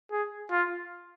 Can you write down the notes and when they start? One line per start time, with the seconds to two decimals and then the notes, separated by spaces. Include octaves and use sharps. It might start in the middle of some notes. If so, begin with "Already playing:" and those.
0.11 G#4
0.51 F4